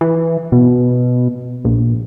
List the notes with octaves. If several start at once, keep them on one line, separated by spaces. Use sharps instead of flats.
E3
B2
A#1